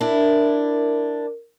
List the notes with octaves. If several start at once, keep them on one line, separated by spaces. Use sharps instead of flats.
D4 E4 A#4